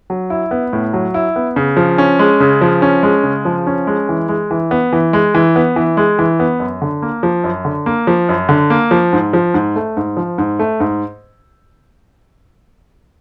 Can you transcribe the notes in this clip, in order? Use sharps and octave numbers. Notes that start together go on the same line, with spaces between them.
F#3
E4
B3
A2
F#3
E4
B3
C#3
F3
C#4
G#3
C#3
F3
C#4
G#3
C#3
F3
C#4
G#3
E3
G#3
E3
B3
E3
G#3
E3
B3
E3
G#3
E3
B3
F#2
D3
A#3
F3
F#2
D3
A#3
F3
F#2
D3
A#3
F3
G#2
F3
G#2
A3
G#2
F3
G#2
A3
G#2